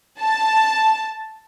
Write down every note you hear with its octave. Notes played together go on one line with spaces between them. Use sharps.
A5